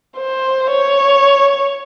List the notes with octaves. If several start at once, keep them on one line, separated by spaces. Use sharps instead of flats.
C5
C#5